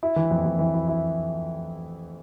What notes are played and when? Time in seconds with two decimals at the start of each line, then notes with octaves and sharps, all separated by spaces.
0.03 E4
0.16 E3
0.31 F2
0.45 F2
0.59 E3
0.74 E4
0.88 E4